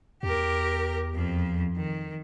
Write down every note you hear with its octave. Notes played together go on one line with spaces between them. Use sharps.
E2 G4 A#4
F2 F3
D#3